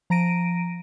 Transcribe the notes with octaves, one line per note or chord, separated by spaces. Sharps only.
F3 A#5 A#6 D7 D#7